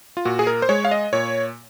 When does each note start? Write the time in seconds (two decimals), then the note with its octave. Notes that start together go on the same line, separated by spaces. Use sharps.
0.17 F4
0.25 A#2 F#4
0.39 G#4
0.47 A#4
0.62 C5
0.69 G#3 C#5
0.85 F5
0.91 D#5
1.13 A#2 C#5